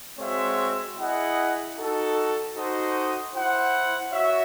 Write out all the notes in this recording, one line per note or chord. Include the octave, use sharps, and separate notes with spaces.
G#3 C4 F#4 C#5 E5
E4 G#4 D#5 F#5
D#4 F#4 A4
D#4 F#4 A4 C5 D#5
E4 C5 F#5
F#4 C#5 E5